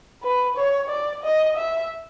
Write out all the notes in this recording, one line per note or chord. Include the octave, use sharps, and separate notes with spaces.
B4
C#5
D5
D#5
E5